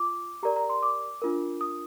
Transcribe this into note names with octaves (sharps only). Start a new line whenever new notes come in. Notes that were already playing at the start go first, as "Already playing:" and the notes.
Already playing: F4 D6
G4 A#4 D5 A#5
A#5
C6
D6
D4 F4 A#4
D#6